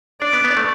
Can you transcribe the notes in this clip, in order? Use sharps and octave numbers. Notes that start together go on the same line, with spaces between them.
D4 D5
B3
B3
A3